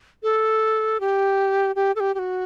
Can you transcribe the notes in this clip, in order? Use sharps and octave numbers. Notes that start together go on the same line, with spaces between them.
A4
G4
G4
A4
G4
G4
F#4